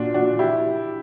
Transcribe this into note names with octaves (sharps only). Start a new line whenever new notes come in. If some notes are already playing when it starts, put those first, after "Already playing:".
Already playing: A#2 D4 F#4
D4 F#4
E4 G4